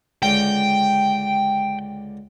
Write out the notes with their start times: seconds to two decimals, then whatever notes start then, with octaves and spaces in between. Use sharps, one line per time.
0.23 C#2 D3 C#4 G5